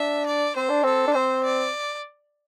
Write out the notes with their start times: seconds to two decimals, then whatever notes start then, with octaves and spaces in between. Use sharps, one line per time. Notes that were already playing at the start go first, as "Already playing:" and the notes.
Already playing: D4 E5
0.27 D5
0.56 C4 C5
0.69 D4
0.83 C4 A4
1.07 D4
1.14 C4 C5
1.44 D5